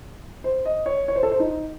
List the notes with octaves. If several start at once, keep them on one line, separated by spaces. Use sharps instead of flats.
C5
D#5
C#5
C#5
C5
A4
C5
D#4